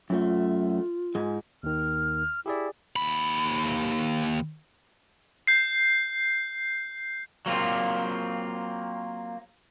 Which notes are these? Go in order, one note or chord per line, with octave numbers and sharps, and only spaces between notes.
F#2 A3 F4
G#2 G#3
D#2 D#3 F6
E4 G4 G#4 D5
D#2 B5
G6 C7
F#3 A#3 C4 F4